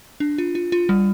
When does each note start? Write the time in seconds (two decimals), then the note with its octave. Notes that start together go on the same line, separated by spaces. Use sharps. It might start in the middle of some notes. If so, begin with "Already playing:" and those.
0.20 D4
0.38 F4
0.55 F4
0.72 F4
0.89 G3